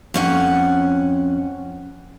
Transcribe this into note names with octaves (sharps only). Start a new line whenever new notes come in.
F2 C#4 F#5